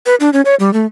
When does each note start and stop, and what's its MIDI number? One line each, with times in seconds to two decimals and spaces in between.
0.06 0.15 71
0.20 0.30 62
0.33 0.41 61
0.45 0.55 73
0.60 0.72 55
0.73 0.86 57